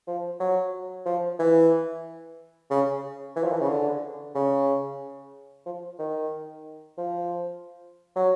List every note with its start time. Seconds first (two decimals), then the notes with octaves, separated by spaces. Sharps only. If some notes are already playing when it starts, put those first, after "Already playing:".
0.07 F3
0.40 F#3
1.06 F3
1.39 E3
2.70 C#3
3.36 E3
3.44 F3
3.52 E3
3.60 C#3
3.69 D3
4.35 C#3
5.66 F3
5.99 D#3
6.98 F3
8.16 F#3